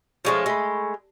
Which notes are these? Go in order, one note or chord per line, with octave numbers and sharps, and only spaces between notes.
F3 G#3 A3 C#4 C#5
G#3 A3 B5